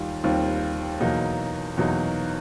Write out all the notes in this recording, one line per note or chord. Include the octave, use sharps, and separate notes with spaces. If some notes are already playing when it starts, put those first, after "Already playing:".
Already playing: D#2 D#3 G3 F4
D#2 D#3 G3 C4 F4
E2 B2 F#3 A#3 D#4
E2 B2 F#3 A#3 D#4